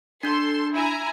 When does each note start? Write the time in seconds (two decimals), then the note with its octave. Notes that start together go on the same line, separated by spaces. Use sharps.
0.23 D4 A4 C6 G6
0.73 E4 G#5 A#5